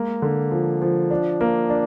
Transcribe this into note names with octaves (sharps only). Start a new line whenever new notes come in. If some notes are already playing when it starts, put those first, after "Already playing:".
Already playing: G#3 A#3
D3
F3
F3
D4
A#3
D4